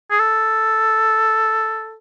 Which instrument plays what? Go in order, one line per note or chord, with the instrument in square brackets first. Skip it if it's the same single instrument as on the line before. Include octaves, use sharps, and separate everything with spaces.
[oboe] G#4
A4